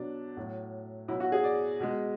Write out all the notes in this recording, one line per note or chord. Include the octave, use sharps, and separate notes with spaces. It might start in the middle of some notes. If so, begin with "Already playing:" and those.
Already playing: B2 F#3 D4
A2 F#3
B2 F#3 E4
F#4
G#4
D5
B2 G#3